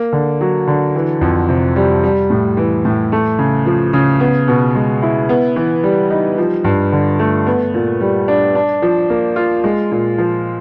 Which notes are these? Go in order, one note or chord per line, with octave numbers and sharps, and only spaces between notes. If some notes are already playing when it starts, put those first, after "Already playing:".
Already playing: A#3
D3
F#3
D3
E3
F2
C3
G3
G3
A2
E3
A2
A3
C#3
F3
C#3
B3
B2
G#3
E4
B3
E3
G3
D#4
F3
G2
D3
A3
B3
A#2
G3
D4
D4
F3
A#3
F4
G#3
A#2
F3